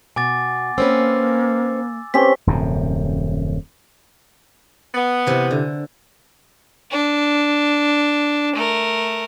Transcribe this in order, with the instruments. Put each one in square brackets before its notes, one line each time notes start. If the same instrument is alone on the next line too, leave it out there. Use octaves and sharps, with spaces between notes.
[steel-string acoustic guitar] B2 [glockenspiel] G#5 D6 A6
[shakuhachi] A#3 [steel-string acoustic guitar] C4 C#4 B4 [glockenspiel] E6
[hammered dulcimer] C4 C#4 G4 [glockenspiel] C#6 B6
[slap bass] D#1 F#2 C3
[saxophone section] B3
[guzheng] C3 E3
D3
[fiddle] D4
A3 A#4